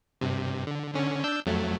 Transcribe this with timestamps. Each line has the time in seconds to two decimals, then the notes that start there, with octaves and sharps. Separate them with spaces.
0.21 G2 C3
0.67 D3
0.94 D3 C#4
1.24 D4 E6 G6
1.46 F2 F#3 A3